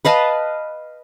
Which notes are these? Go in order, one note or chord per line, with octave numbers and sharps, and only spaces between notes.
B4 D#5 F5 A5